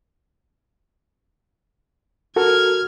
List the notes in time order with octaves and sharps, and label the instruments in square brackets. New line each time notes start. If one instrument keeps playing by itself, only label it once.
[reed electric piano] F#4 A4 A#4 [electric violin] F6 G#6